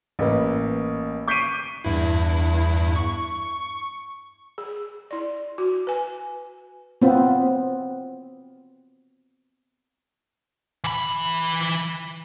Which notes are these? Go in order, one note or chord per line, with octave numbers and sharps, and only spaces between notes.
A1 A#3 B4
C#6 G6 B6 C7 D7 D#7
E2 G2 E4
C#6
G#4
E4 D5
F#4
B4 G#5
B3 C4 F4
E3 B5